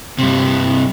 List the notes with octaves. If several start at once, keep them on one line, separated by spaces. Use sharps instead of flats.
G2 C3